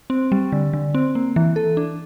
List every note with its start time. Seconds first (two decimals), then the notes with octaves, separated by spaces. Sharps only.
0.10 C4
0.32 G3
0.52 D3
0.73 D3
0.94 C4
1.15 A#3
1.36 E3
1.56 A4
1.77 D4